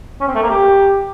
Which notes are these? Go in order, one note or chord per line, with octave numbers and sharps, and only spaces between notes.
C#4
C4
A3
A#3
G4